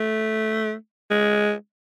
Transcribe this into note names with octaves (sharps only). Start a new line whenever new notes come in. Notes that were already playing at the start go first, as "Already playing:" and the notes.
Already playing: A3
G#3